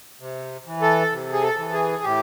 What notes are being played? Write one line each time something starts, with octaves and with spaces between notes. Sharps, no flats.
C3
E3
A4
C3
G#4
A4
E3
G#4
A2 G4